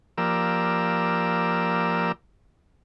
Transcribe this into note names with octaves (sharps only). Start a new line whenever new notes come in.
F3 A#3 G4 A#4 D5 E6